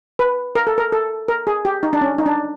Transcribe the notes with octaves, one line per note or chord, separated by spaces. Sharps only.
B4
A#4
A4
A#4
A4
A#4
G#4
G4
D#4
D4
C#4
D#4
D4